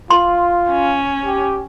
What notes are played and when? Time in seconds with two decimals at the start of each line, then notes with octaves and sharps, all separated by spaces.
0.10 F4 C6
0.71 C#4
1.25 G4